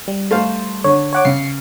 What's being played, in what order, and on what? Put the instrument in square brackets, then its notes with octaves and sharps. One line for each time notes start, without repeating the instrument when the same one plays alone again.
[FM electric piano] G3
[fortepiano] A3 C5 F5
[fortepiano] D3 [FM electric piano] C#5
[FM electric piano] C#5 F#5 D6
[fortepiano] C#3 [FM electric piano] C7 C#7